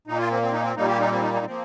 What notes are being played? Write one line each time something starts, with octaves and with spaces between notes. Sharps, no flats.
A#2 A#3 D#4
F4
C4
C4
D#4
C4
A#2 G3 A#3 D#4
G4
D#4
C4
D#4
D#4
F3 A#3 C4